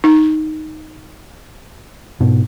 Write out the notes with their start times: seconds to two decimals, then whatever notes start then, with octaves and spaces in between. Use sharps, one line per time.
0.04 D#4
2.21 G#2 B2